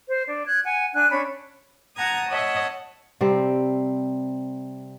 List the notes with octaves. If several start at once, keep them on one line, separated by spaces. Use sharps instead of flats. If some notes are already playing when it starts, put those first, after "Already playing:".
C5
D4
F#6 G#6
F#5 G#5
D4 G#5 F#6
C#4 D4 C#5 B5
F#5 A5 A#5 D#6 G#6
C#5 D#5 E5 F#5 A5
C3 G3 C4